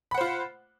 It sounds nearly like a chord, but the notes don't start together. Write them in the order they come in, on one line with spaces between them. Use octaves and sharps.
B5 F#5 C5 F4